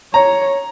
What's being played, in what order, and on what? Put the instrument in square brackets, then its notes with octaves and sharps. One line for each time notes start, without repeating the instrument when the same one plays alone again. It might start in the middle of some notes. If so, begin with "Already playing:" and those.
[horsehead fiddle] C#5 [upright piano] A#5